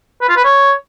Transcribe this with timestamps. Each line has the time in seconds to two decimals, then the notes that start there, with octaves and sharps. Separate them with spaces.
0.21 B4
0.29 F4
0.37 B4
0.44 C#5